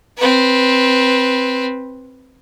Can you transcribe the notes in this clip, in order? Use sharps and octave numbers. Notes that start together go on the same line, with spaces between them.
C4 B4